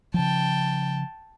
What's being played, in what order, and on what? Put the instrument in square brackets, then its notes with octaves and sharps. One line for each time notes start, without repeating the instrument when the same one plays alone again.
[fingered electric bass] C#3 F3 [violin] G5 A5